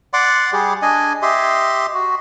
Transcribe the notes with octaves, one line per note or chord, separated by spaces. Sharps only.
D5 F#5 C6 D6
G3 G4 G#4
D4 D#5 G#5
G4 D#5 E5 C6
F#4